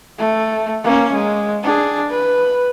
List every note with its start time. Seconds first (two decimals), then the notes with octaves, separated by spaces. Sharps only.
0.18 A3
0.84 A#3 C#4
1.13 G#3
1.63 D4 G#4
2.11 B4